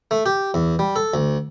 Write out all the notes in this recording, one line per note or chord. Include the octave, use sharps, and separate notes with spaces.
A3
G4
E2
G3
A4
D2